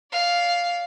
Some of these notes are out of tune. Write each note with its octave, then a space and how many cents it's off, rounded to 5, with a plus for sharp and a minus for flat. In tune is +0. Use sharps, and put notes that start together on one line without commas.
D5 -35 F5 +0